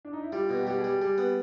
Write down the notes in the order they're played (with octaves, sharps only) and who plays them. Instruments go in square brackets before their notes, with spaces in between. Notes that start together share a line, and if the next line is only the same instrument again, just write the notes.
[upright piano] D4
D#4
E4
[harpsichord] G3 [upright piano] F4
[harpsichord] B2
[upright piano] F#4
G4
[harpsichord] G3 [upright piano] F#4
[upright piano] G#4
[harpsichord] G3
[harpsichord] G3 [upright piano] G#4
[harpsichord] B3